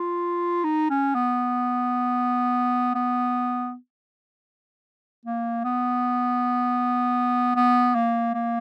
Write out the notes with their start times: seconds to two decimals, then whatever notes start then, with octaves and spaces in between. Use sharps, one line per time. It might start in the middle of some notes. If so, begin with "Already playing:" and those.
Already playing: F4
0.64 D#4
0.90 C#4
1.15 B3
2.95 B3
5.25 A#3
5.64 B3
7.56 B3
7.95 A#3
8.34 A#3